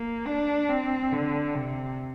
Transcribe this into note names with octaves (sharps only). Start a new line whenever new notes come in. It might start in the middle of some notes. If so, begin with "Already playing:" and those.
Already playing: A#3
D4
C4
D3
C3